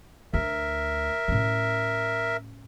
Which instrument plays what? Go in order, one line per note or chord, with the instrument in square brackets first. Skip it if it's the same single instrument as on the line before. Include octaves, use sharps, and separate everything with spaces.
[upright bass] D2 [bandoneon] A#4 E5
[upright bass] A2 C#4